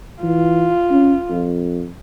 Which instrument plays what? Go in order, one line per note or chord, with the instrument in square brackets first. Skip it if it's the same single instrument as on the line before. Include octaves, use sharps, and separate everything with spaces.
[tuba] E3 [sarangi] F4
[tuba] C#4
F2